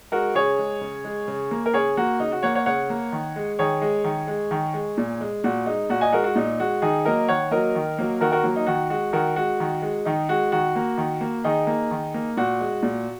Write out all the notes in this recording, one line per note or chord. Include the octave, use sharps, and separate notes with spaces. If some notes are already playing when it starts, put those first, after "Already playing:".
G#3 F#4 A#4
C#3 G#4 C#5
G#3
C#3
G#3
C#3
A#3
A#4
C#3 G#4 C#5
A#3 F#4
C#3 D#4
F#4
A#3 C#5 F#5
C#5 F#5
C#3 C#5 F#5
A#3
D#3
G#3
D#3 G#4 C#5
G#3
D#3
G#3
D#3
G#3
A#2
G#3
A#2 F#4
G#3 D#4
A#2 F#4
D#5 G#5
G#3 F#4 A#4
F#4
A#2 D#4
G#3 F#4
D#3 D#4 G#4
F#3 A#3 A#4 D#5
D#3 C#5 F#5
F#3 A#3 A#4 D#5
D#3
F#3 A#3
D#3 F#4 A#4
F#4 A#4
F#3 A#3
D#4
D#3 F#4
G#3 F#4
D#3 F#4 A#4
G#3 F#4
D#3
G#3
D#3 D#4
G#3 F#4
D#3 F#4
A#3
D#3
A#3
D#3 D#4 G#4
A#3
D#3
A#3
A#2 F#4
G#3
A#2